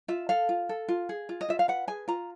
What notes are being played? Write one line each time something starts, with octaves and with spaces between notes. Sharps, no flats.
F4 E5
A4 F5
F4
A4
F4
G#4
F4
D#5
F4 E5
F5
B4 F#5
G#4 G#5
F4 A#5